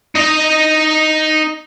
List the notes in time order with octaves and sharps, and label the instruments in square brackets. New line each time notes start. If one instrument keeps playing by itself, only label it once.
[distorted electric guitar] D#4 D#5